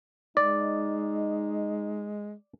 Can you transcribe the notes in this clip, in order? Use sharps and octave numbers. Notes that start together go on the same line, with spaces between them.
G#3 D#4 D5